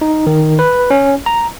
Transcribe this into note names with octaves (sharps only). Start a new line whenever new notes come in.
D#4
D#3
B4
C#4
A#5